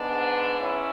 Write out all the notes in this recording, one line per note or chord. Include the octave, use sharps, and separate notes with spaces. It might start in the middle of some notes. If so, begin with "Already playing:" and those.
Already playing: G#2 G#3 B3 D4
C#4 E4